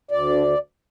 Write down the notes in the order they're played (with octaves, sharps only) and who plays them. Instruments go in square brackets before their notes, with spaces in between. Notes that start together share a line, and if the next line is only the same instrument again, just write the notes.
[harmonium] D2 D5
D3